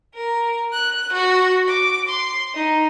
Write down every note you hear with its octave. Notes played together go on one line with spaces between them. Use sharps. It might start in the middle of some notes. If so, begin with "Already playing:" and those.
A#4
F#6
F#4
D6
C6
D#4